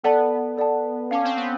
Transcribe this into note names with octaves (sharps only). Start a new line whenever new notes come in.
B3 A4 D5 F#5 A5
A4 D5 F#5 A5
C#4 F5 A5 D6
C4
B3